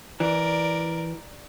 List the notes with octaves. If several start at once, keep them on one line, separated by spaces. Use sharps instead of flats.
E3 A#4 D5